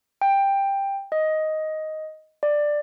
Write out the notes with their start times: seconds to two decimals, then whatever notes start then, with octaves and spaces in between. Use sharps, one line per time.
0.22 G5
1.12 D#5
2.43 D5